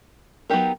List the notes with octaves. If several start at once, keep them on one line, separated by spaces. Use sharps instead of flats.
F#3 B3 D#4 G4 A#4